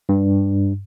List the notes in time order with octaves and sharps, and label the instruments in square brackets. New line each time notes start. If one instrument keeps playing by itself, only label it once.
[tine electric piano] G2